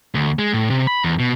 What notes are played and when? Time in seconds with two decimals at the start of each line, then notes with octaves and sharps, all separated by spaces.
0.15 D2
0.39 G#3
0.54 A2
0.70 C3
0.87 B5
1.04 E2
1.19 B2